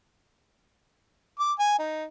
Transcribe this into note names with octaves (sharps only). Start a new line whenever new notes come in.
D6
G#5
D#4